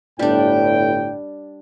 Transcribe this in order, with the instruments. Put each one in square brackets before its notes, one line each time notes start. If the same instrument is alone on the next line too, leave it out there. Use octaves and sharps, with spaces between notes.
[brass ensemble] G1 A2 G5 [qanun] G3 D4